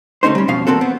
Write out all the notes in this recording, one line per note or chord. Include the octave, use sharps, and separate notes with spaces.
D2 A3 C#4 D#4 C5
G3 C#4
F2 B2 F3 C#4 F5
E2 A#3 C4 F#4 A4
B3 C4